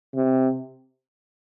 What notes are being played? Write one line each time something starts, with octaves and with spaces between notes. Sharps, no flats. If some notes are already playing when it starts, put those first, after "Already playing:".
C3